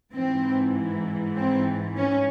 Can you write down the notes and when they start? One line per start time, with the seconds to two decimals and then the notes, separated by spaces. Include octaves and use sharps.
0.14 G#2 E3 C4
1.36 C4
1.96 C#4